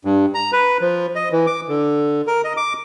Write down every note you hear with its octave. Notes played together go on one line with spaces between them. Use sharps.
G2
A#5
B4
F3
D#5
E3
D6
D3
A#4
D#5
D6